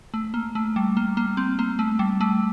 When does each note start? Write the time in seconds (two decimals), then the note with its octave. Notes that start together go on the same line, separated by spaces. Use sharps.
0.14 A3
0.34 A#3
0.55 A3
0.76 G3
0.97 A#3
1.17 A#3
1.37 C4
1.59 A#3
1.79 A3
1.99 G3
2.21 A3